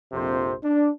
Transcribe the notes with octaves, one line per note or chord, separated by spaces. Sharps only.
A#1 F2 C3 C5
D4